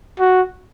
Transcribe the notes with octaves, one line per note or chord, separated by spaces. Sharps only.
F#4